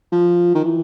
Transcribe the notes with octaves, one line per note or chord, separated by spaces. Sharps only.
F3
D#3
E3